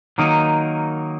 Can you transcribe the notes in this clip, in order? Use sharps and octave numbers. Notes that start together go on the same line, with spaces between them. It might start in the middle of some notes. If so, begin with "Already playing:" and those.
D#3 F#3 A#3 D#4